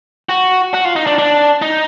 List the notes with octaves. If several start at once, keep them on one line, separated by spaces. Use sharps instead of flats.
F#4
F#4
F4
D#4
D4
D4
D#4